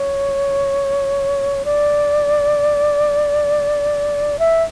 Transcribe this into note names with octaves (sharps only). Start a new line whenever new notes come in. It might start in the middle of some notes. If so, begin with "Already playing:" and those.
Already playing: C#5
D5
E5